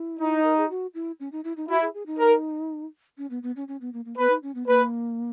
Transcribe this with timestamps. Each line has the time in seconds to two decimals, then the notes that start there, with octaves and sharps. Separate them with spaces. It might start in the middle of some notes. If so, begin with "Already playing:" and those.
Already playing: E4
0.20 D#4
0.43 A#4
0.57 G#4
0.69 F#4
0.94 E4
1.20 C#4
1.32 D#4
1.44 E4
1.57 D#4
1.69 E4 F#4
1.82 G#4
1.94 G#4
2.07 D#4
2.19 A#4
3.18 C#4
3.30 B3
3.43 B3
3.56 C#4
3.68 C#4
3.81 B3
3.93 A#3
4.05 A#3
4.18 B3 B4
4.30 D#4
4.43 C#4
4.55 B3
4.67 A#3 B4